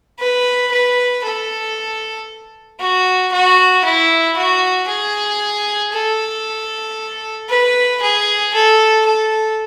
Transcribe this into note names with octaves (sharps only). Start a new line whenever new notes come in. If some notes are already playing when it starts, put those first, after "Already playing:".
B4
B4
A4
F#4
F#4
E4
F#4
G#4
A4
B4
G#4
A4
A4